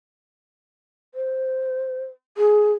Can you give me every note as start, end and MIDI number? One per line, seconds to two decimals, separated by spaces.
1.14 2.03 72
2.37 2.72 68